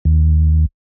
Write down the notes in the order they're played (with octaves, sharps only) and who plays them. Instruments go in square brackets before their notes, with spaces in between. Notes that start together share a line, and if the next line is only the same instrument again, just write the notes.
[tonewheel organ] D#2